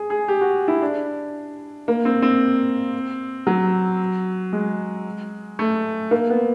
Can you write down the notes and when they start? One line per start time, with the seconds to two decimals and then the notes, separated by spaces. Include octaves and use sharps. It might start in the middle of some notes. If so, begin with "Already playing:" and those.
Already playing: G#4
0.10 G#4
0.28 G4
0.41 F#4
0.68 E4
0.82 D4
1.88 A#3
2.05 C4
2.22 C4
3.47 F#3
4.53 G#3
5.59 A3
6.11 A#3
6.30 B3